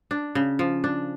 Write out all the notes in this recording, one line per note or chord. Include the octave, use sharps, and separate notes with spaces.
D4
C#3
F3
D4